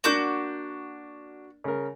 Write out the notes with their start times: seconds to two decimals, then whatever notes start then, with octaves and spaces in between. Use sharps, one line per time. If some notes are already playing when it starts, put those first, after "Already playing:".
0.04 A#3 D4 F#4 D6 G6
1.64 C#3 A#4